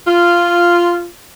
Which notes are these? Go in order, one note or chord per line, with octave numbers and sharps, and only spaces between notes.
F4